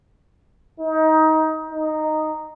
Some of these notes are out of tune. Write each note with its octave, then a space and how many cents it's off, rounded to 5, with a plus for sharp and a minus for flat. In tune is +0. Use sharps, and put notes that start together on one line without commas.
D#4 +20
D#4 -5